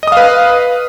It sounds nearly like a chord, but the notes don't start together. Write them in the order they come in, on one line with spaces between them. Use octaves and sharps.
D#5 D#6 F5 B4